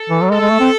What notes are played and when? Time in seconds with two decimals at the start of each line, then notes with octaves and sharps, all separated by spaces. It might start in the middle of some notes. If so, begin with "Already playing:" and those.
Already playing: A4
0.10 E3
0.22 F#3
0.30 G#3 A4
0.41 G#3
0.51 A3
0.60 C4